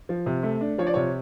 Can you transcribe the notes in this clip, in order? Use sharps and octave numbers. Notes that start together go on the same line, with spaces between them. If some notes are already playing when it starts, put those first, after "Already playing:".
F3
C3
A3
D4
F3 C#5
D5
C3 C#5